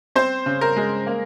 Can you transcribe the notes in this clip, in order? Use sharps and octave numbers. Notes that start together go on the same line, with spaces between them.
C4 C5
C#3
A#4
G#3
A#3